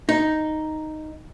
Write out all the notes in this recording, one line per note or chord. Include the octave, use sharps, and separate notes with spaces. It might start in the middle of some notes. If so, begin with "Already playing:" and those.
D#4